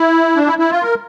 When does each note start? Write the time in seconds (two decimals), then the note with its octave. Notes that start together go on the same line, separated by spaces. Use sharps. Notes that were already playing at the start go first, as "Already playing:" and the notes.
Already playing: E4
0.36 D4
0.47 E4
0.59 E4
0.71 F4
0.82 A#4